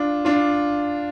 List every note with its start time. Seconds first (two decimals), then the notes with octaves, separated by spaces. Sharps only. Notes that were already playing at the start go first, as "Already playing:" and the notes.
Already playing: D4 F4
0.25 D4 F4